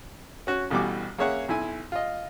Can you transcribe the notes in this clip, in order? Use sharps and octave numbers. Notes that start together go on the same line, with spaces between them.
C#4 F#4
A1 B2 E3 G3 F#4 D6
A#3 C#4 G#4 C#5 E5 F#5
B1 E4 G#5
F4 D#5